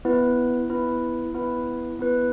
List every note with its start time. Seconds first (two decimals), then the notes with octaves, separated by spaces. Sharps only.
0.05 B3 E4 B4
0.70 B3 E4 B4
1.34 B3 E4 B4
1.99 B3 E4 B4